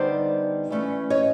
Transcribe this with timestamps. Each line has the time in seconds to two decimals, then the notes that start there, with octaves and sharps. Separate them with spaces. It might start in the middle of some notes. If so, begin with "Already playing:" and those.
Already playing: D3 G3 B3 D#4 C5 D5
0.70 E3 A3 C#4 E4
1.10 C#5 D#5